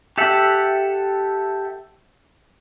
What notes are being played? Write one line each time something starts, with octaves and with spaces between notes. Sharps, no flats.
G4 A4 E5 F#5